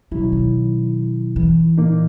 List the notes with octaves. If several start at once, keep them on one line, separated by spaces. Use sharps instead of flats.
B2 D#3 F#3 C#4 E4
D#3
E3
A#2 A#3 D#4